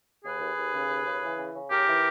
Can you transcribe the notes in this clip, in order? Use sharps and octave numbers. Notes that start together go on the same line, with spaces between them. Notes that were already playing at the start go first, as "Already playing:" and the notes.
D#2 G#4 B4
D#2
D#2
C#3
D#2
C#3
E3
C#3
C#3
D#2 G4 A#4
E3